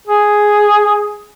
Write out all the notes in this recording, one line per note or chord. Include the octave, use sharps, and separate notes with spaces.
G#4